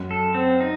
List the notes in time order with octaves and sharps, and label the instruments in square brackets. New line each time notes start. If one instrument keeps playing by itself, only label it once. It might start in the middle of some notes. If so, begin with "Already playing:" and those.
Already playing: [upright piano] F#2
[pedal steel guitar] A4
C4
D#4